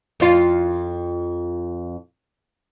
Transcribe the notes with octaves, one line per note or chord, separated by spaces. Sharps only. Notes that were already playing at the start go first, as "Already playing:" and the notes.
F2 F4